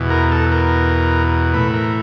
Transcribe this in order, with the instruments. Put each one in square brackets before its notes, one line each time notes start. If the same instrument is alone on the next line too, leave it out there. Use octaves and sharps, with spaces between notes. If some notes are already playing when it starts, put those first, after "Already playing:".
Already playing: [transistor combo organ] E2 B2
A#4
A4
A#4
A2 E3 B4
A#4